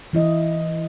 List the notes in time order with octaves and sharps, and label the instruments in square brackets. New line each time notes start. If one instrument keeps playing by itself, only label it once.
[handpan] E3 E4 D#5